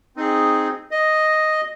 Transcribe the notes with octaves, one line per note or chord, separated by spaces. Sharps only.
C4 D#4 G#4
D#5